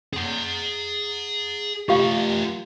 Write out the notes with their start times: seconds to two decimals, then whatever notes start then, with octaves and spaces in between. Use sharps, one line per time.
0.13 G#4 F#5
1.89 A3 F4 G4 F5